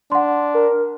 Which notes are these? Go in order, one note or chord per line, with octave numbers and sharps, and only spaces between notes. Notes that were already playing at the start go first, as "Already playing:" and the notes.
D4 F#5 C6
A#4